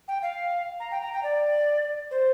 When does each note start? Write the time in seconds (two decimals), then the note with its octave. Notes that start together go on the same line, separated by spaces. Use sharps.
0.08 G5
0.22 F5
0.80 A#5
0.91 G5
1.02 A#5
1.13 G5
1.23 D5
2.11 C5